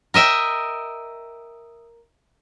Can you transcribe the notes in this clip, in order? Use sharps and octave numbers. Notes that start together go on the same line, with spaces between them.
A#4 D#5 E5 G5